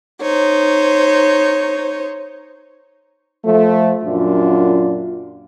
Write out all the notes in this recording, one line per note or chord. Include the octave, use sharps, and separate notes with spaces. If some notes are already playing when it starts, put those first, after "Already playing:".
D#4 C5 C#5
F3 A3
F#2 A#2 D4 F4